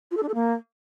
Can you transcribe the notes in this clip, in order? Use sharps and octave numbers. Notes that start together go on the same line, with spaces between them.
F4
A4
D4
A4
A#3